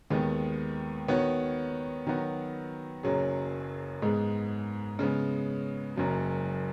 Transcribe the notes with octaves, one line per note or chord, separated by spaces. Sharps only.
D#2 D#3 G#3 B3
D#3 B3 F#4 C#5
D#3 F#3 B3 F#4
F#1 F#2 F#3 C#4 G#4
G#2 G#3 B3 G#4
C#3 G#3 B3
F#1 F#2 F#3